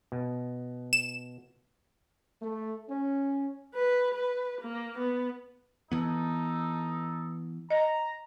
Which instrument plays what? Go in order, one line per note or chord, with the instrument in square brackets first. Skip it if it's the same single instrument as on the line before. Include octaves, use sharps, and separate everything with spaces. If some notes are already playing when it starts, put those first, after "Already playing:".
[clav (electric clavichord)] B2
[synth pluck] E7
[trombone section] A3
C#4
[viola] B4
B4
A#3
B3
[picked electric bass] E3 B3 [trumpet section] D#4 A4
[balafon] D#5 [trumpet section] A#5